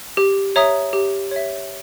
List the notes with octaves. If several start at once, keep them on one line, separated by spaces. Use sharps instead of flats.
G4
C#5 E5 A#5 D#6
G4
C#5 E5